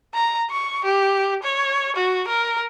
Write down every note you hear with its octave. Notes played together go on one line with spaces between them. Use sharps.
A#5
C#6
G4
C#5
F#4
A#4